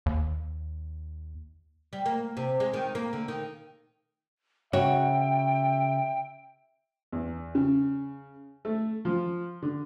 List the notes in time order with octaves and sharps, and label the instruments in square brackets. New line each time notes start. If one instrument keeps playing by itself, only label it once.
[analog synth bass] D#2
[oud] G3
A#3
C3
G#3
D#3
A#3
D3
D#3
[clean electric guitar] C#3 [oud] F#4 C#5 [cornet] E5 [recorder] G5
[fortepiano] E2
C#3
A3
F3
D3